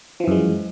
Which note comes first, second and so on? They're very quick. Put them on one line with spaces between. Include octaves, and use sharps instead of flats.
F3 E3 F#2 G#3